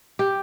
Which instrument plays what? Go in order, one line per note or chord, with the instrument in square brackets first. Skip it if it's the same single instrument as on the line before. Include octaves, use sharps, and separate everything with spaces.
[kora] G4